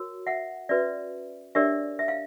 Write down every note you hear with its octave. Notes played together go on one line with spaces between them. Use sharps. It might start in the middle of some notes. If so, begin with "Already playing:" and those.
Already playing: F#4 A#4 C#5
E5 F#5
C#4 F#4 B4 D5 E5
D4 G4 A#4 C#5 D5 E5
E5
F5